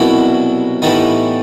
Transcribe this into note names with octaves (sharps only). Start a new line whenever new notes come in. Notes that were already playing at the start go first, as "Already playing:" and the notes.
Already playing: C2 B2 F#3 B3 E4
A2 E3 G3 B3 D#4